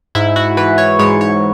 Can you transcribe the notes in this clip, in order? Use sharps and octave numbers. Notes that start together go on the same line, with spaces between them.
G#2 E4
F#4
E3 B4
C#5
G#2 C#5
C#5